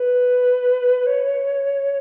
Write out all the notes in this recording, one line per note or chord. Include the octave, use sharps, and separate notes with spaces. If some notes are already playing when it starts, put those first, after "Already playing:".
Already playing: B4
C#5